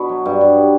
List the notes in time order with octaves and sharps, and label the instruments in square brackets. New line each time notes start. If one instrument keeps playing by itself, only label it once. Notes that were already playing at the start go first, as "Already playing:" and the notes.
Already playing: [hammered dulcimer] B2 B3 D4
F#3
G2
G2